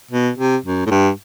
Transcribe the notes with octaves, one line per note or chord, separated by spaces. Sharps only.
B2
C3
F#2
A2
G2